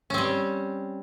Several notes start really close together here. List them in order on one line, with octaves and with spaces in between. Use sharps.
C#4 C4 G3